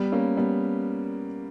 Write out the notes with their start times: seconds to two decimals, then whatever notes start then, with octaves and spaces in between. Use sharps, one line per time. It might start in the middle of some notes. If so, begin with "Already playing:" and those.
Already playing: G3 B3
0.12 A#3 C#4
0.37 G3 B3